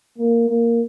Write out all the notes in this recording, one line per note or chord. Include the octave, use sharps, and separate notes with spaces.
A#3
A#3